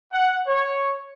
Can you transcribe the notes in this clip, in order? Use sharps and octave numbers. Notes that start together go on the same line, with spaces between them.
F#5
C#5